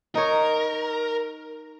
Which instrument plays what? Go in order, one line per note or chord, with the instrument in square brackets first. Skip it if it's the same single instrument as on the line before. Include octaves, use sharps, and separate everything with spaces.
[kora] D#4 C#5 [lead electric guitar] A#4